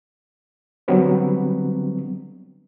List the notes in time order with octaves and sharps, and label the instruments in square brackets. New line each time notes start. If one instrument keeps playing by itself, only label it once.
[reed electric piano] D3 F#3 G3 B3 C4 D4